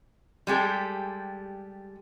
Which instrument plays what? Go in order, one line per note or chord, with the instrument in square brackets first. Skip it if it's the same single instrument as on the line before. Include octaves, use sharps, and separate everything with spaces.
[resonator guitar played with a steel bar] G3 G#3 G4 A4